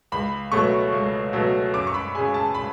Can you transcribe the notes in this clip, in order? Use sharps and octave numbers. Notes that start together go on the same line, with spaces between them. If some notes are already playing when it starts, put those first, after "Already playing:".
C#2 B5
B2 F#3 A3 C#6
C#2
B2 F#3 A3
F#2 D6
C#6
B5
C#3 G#3 G#5
A5
B5